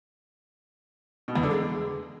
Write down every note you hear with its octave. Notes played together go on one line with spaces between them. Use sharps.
B2
E2
D3
G#3